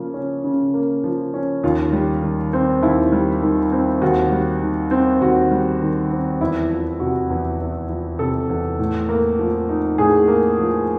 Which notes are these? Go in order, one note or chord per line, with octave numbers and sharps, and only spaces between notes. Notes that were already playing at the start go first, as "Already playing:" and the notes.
Already playing: C#3 F3 A#3
C#4
C#3
A#3
F3
C#4
D#2 F4
G3
D#3
C4
D#2 E4
G3
D#3
C4
D#2 F#4
G3
D#3
C4
D#2 F#4
G3
D#3
C4
E2 E4
F3
C3 F#4
E2
E2
F3
C3 A4
E2
A2
A#3
F3
D#4
A2 G#4
A#3
F3